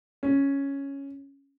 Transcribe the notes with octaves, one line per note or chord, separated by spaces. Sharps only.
C#4